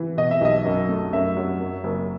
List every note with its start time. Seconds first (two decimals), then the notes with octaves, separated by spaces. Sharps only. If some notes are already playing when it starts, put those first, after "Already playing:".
Already playing: E3
0.17 B2 D#5
0.31 E5
0.41 B1 D#5
0.65 F#2
0.89 A3
1.13 F#2 E5
1.37 F#3
1.60 F#2
1.84 F#1